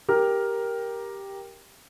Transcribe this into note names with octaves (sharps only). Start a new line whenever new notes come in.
G4 A#4 F6